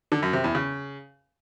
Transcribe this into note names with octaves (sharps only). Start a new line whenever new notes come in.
D3
F#2
C3
E2
C#3